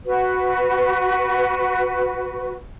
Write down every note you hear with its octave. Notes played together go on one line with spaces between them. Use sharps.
F#4 B4